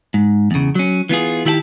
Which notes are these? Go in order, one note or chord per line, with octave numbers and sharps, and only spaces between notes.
G#2
E2 C#3
F#3 C#4
E3 B3 F4 G#4
D#3 E4 G4 F#5 A5